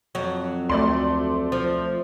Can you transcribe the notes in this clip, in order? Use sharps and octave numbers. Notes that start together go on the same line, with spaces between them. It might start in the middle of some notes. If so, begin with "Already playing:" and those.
F2 F#3
D2 A3 D5 C6
F3